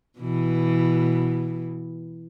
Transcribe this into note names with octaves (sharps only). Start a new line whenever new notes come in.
B2 E3